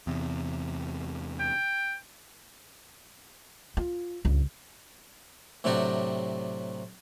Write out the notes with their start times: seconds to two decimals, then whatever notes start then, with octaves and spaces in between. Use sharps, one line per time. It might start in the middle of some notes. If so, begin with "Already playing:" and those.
0.07 E2 C3
1.40 G5
3.77 F4
4.25 C#2 G2
5.64 A2 C3 F#3 D4 F#4 G4